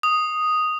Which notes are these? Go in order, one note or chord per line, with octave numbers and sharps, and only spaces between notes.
D#6